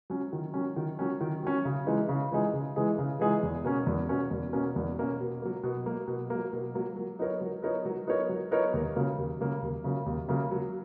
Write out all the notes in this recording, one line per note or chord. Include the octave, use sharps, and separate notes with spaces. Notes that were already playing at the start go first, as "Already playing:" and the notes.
F#3 C#4
D#3
F#3 C#4
D#3
F#3 C#4
D#3
F#3 C#4
C#3
E3 G#3 D#4 G#4
C#3
E3 G#3 D#4 G#4
C#3
E3 G#3 D#4 G#4
C#3
E3 G#3 D#4 G#4
E2
B2 A#3 C#4
E2
B2 A#3 C#4
E2
B2 A#3 C#4
E2
B2 A#3 C#4
B2
F#3 A#3
B2
F#3 A#3
B2
F#3 A#3
B2
F#3 A#3
F#3
B3 D#4 A#4 C#5
F#3
B3 D#4 A#4 C#5
F#3
B3 D#4 A#4 C#5
F#3
B3 D#4 A#4 C#5
D#2
C#3 F#3 A#3
D#2
C#3 F#3 A#3
D#2
C#3 F#3 A#3
D#2
C#3 F#3 A#3
F#3